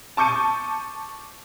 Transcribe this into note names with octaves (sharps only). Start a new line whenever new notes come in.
A5 C#6 D6 G6 C#7 D#7